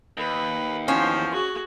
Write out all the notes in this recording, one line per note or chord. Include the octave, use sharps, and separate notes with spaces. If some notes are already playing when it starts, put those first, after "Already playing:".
D#2 B4
E2 F3 C#4 C5
F#4 G#4